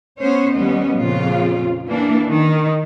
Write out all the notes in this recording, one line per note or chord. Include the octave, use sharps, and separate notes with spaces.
B3 C#4 C5 C#5
D#2 G3 B3 C#4 D#5
F2 A#2 C#3 F4
E3 A#3 D4
D#3